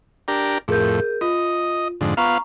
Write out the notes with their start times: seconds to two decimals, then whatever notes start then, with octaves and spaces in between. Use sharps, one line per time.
0.28 D4 G4 A#4
0.68 F2 A2 G#4 A#4 G6
1.21 F4 D#5
2.01 F2 G#2 D3
2.17 B3 F4 F5 A#5 C#6